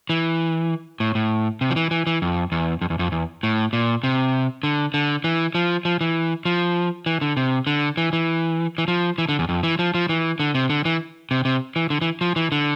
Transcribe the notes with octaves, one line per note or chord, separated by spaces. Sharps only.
E3
A2
A2
C3
F3
E3
E3
E3
F2
E2
F2
E2
F2
E2
A2
A#2
C3
D3
D3
E3
F3
F3
E3
F3
E3
D3
C3
D3
E3
E3
E3
F3
E3
D3
E2
F2
E3
F3
F3
E3
D3
C3
D3
E3
C3
C3
E3
D3
E3
F3
E3
D3